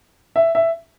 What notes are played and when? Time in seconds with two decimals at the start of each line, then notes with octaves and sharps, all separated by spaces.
0.36 E5
0.55 E5